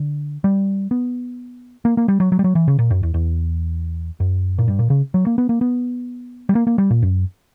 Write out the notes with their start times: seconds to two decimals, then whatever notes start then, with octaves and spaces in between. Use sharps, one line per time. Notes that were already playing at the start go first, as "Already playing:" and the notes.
Already playing: D3
0.44 G3
0.91 B3
1.85 A#3
1.97 A#3
2.08 G3
2.20 F#3
2.32 F#3
2.39 G3
2.44 F#3
2.55 E3
2.68 C#3
2.79 A#2
2.91 F#2
3.03 E2
3.14 E2
4.20 F#2
4.58 A#2
4.68 G2
4.79 A#2
4.90 C#3
5.14 F#3
5.27 A#3
5.38 B3
5.49 A#3
5.61 B3
6.49 G3
6.55 A#3
6.67 A#3
6.78 G3
6.90 A#2
7.02 F#2